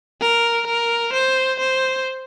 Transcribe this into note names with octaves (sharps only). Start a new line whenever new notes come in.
A#4
A#4
C5
C5